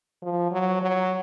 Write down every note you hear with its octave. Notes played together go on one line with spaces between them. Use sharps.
F3
F#3
F#3